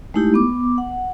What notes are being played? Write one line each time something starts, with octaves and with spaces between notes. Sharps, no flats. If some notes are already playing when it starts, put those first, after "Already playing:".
G#3 A3 D#4 E4 G4
B3 D6
F#5